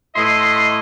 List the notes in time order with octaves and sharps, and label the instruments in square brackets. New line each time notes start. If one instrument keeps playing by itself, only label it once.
[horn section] A2 E4 D#5 [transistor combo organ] C6